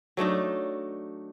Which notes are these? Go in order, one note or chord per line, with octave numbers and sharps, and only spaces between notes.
F#3 A3 D4 D#4